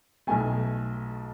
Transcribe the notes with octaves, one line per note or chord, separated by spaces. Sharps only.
B1 B2 A3 G#5